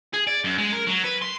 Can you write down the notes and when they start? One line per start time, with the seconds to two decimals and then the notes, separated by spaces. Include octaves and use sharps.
0.14 G#4
0.27 D5
0.44 F#2
0.58 G#3
0.72 A#4
0.87 F#3
1.04 B4
1.22 C6